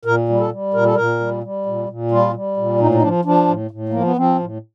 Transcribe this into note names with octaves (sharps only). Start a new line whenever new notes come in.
A#2 A#4
G3
A4
G3
A#2 A#4
A4
A#2 A#4
G3
G3
A#2
A#2
G3 F4
G3
A#2
A2 D#4
D#4
F3 D4
F3 D4
A2
A2
F3 A#3
B3
F3 C4
A2